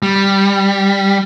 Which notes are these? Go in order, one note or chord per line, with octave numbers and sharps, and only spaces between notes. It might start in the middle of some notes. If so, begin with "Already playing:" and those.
G3